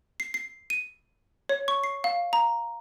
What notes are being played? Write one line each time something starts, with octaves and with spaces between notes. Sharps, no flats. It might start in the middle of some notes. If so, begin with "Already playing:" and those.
C7
C7
D#7
C#5
C#6
C7
F5
A#5